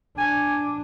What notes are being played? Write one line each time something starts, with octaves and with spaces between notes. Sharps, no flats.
D4 G#5